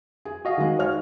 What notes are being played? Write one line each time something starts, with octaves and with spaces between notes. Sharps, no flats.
G#4
F#4 D#5 F5
D#3 G#3
C#5 F6